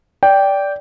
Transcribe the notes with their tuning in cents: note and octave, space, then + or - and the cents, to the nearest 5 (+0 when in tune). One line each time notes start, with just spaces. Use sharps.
D5 -15 G5 +0